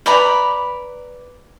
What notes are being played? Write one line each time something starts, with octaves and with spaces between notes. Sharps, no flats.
B4 D5 A#5 B5